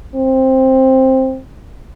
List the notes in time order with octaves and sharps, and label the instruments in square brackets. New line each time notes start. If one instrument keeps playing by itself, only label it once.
[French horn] C4